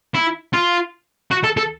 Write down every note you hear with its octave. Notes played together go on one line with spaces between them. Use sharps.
E4
F4
F#4
A4
A4